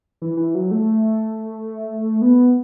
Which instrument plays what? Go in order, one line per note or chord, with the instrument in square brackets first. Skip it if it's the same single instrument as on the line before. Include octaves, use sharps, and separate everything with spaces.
[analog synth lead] E3
E3
F#3
A3
B3